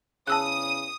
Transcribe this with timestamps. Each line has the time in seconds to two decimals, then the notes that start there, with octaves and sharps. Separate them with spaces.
0.27 E2 C#3 A5 D#6 E6 F#6